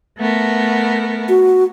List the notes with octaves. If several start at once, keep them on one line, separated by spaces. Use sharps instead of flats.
A3 B3 A#4
F#4